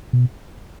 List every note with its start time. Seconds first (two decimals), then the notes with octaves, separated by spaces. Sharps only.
0.13 B2